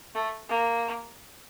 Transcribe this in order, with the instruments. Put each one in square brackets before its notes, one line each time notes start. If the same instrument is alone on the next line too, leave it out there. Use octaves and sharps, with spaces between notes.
[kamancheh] A3
A#3